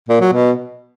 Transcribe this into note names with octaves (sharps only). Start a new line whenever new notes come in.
A#2
F#3
B2